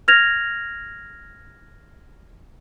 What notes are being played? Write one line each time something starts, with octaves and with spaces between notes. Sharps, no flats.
F6 G#6 A#6 F7